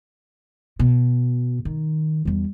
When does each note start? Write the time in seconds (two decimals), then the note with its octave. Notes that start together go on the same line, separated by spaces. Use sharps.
0.79 B2
1.65 D#3
2.25 E2 G3